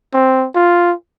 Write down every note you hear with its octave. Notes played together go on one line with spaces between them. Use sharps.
C4
F4